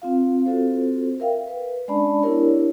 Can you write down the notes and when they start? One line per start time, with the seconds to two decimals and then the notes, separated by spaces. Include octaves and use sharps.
0.02 C4 F4 F5
0.46 C4 F4 F#4 A4 C5
1.20 A#4 E5 F5 G5
1.47 B4
1.88 G#3 C#4 D4 D5 A5 B5
2.23 B3 D4 E4 G4 A#4 C#5